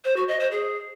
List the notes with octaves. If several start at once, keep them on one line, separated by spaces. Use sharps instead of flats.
C5
F#4
D#5
C5
G#4